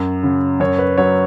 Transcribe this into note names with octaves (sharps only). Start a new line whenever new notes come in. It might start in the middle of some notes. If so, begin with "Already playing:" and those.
Already playing: F#2
C#3 F#3
F#2 C#5
B4
F#3 C#5